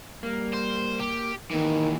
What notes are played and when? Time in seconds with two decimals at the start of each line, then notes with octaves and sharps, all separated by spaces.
0.23 G3 A#3
0.53 C5
1.00 G4
1.51 D#2 D#3 E3